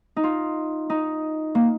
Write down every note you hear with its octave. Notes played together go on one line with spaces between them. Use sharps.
D#4
F4
D#4
A#3